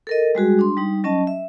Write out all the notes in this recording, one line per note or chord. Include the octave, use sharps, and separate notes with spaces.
A4 A#4 D#5
G3 G#3 F#4 G#4
D4 C6
G3 D#4
F#3 C#4 D#5 A5
E5